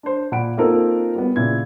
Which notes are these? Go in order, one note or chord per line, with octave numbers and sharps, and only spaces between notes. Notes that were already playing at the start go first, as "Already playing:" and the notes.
D4 C5
A#2 F#5 B5 D7
A#3 C4 D#4 F4 A4 A#4
G3 B3
A#2 C#3 E4 G#6